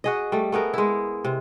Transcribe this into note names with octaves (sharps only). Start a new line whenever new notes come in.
F#4 G#4 D#5
G3 A3
A3 B3 G#4 A#4
G#3 E4
C3